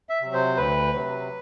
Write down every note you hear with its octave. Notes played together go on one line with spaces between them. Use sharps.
E5
C3 F#3
C5
D2 B4
C3 F#3